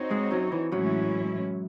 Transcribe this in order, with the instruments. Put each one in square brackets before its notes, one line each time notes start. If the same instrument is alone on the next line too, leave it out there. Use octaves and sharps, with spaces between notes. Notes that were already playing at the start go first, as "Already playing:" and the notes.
Already playing: [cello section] C4 D#4 F#4 C#5
[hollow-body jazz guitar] G#2 G#3
F#2 F#3
E3
[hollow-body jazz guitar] F#2 F#3 [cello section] A2 E3 G#3 C#4 E4